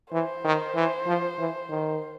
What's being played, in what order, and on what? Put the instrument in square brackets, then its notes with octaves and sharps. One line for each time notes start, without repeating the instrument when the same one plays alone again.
[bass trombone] E3 [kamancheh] C5
[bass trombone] D#3
E3
F3
E3
D#3